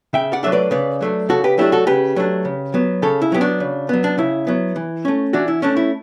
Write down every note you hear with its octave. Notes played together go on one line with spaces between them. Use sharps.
C#3 E5 G5
D5 F#5
F#3 A3 D4 E5
B4 D5
C#3 B4 D5
F#3 A3 D4
C#3 F#4 A4
G4 B4
F#3 A3 D4 E4 G4
F#4 A4
C#3 G4 B4
F#3 A3 D4
C#3
F#3 B3
C#3 A4 C#5
E4
F#3 B3 G4
D4 F#4
C#3
F#3 B3
D4
C#3 E4
F#3 B3
E3
A3 C#4
E3 D4 F#4
E4
A3 C#4 D4
E4